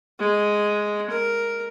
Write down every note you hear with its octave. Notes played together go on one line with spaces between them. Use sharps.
G#3
A#4